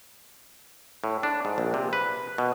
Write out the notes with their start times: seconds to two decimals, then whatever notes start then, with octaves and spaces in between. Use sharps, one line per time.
1.04 A2
1.23 D4
1.45 G#2
1.58 A#1
1.74 C3
1.93 B4
2.38 B2